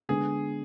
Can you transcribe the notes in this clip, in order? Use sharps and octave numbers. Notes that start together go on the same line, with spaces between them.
D3 G#3 B3 D4 G#4